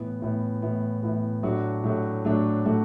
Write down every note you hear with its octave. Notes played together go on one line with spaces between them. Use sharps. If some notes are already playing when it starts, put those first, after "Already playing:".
Already playing: A2 E3 B3
A2 E3 B3
A2 E3 B3
A2 E3 B3
A2 F#3 A3 D4 F#4
A2 F#3 A3 D4 F#4
A2 F#3 A3 D4 F#4
A2 F#3 A3 D4 F#4